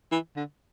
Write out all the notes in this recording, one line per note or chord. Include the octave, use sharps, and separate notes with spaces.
E3
D3